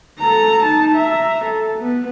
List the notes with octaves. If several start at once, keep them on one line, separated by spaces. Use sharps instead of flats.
A4 A#5
D#4 A5
E5 A#5
A4
B3